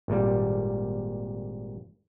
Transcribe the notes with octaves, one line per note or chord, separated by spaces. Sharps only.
G#1 A#2 G3